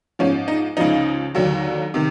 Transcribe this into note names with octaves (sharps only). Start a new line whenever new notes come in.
G#2 F3 C#4
D#4
C#2 C#3 F3 D#4
D#2 D3 F#3
C3 D#3